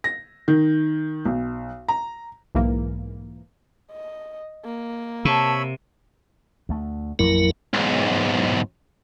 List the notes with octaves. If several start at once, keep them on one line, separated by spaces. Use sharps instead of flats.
A#6
D#3
B1
A#5
B1 G#2 E3 A#3
D#5
A#3
C3 C#5 A5 B5 E6
D2 A3
A1 F2 F#3 A#3 E4 A#4
B1 G#2